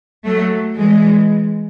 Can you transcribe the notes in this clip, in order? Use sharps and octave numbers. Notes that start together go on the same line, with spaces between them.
F#3 A3
E3 G#3